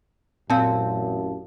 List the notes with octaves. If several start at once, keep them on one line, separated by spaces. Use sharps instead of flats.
A1 F#2 A#2 C4 F5 A5